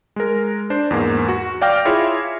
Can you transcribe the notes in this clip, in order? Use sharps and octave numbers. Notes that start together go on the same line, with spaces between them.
G#3 A#4
D4 C5
E2 G#2 A#3
F#4
D5 F5 G5 D6 F6 A#6
E4 F4 G#4 C#5 E5